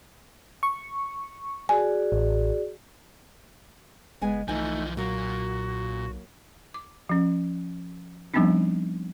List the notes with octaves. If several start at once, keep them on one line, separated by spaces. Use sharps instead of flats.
C#6
F#4 G#4 D5 G#5
A1
F#1 G#3 B3 G#4 G#5
B1 E3 F3 A3 D#4 G#5
A#2 F#3 A#3 F#4
D6
F3 C#4
F3 G3 B3 C4 D4 D#4